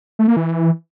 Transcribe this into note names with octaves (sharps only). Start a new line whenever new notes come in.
A3
A#3
E3